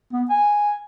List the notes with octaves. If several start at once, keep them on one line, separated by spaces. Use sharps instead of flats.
B3
G#5